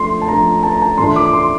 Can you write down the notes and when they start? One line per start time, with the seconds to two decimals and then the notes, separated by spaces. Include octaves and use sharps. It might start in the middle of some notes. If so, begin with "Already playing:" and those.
Already playing: F3 A3 D4 C6
0.21 A5
0.28 F3 A3 D4 A#5
0.63 A5
0.72 A#5
0.82 A5
0.98 A2 E3 A3 D4 F4 C6
1.16 D6
1.33 C6